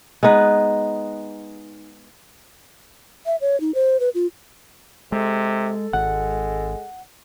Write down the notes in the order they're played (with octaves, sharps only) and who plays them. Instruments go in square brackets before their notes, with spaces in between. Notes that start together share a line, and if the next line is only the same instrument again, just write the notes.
[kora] G#3 B3 D#4 B4
[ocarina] E5
C#5
D#4
C5
B4
F4
[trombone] C3 [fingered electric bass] G#3 [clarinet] A4
[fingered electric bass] G#1 [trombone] G#3 [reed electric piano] F#5